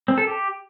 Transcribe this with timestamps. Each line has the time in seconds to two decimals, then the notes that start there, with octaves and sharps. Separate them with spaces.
0.08 C4
0.18 A4
0.27 G4